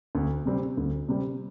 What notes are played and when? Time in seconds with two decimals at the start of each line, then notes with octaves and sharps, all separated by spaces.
0.15 D2
0.45 C3 G3 C4
0.77 D2
1.09 C3 G3 C4